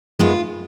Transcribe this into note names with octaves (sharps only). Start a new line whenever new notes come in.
F#2 D#3 G#3 B3 F4